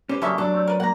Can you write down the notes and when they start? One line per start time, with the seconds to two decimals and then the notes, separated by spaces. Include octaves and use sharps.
0.09 C#4 G4 B4 C5
0.22 G2 C#3 F#3 A#3 C#4 A4 E5
0.38 F#3 D4 A4
0.52 A3 C4 C#5
0.68 A#4 B4
0.80 A#3 F#5 A#5